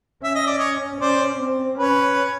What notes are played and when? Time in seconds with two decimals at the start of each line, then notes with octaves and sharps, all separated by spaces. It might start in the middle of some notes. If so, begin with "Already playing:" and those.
0.23 C#4 E5
0.35 D#5
0.47 D5
0.59 C#5 D#5
1.01 C#4 C5 D5
1.39 C4
1.79 C#4 B4 C#5